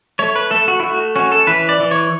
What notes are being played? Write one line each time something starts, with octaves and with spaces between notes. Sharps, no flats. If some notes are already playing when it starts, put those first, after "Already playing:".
A3 C#5
B4
A3 A4
F#4
E4
A3 F#4
C#4 F#4
A4
E3 B4
D5
E3
C#5